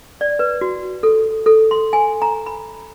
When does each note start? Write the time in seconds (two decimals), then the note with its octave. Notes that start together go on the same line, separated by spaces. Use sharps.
0.21 D5
0.39 B4
0.61 F#4
1.03 A4
1.46 A4
1.71 C6
1.93 G#5
2.22 A#5
2.46 B5